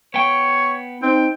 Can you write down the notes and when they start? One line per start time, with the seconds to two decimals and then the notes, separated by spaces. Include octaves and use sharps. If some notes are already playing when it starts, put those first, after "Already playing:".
0.14 B3 C#5 G5
1.02 C4 D#4 G5